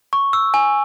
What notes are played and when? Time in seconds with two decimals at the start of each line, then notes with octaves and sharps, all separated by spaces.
0.13 C#6
0.33 E6
0.54 G#5